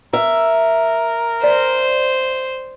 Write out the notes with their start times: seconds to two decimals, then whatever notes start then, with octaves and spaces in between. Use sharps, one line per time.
0.13 A#4 E5
1.44 C5 D5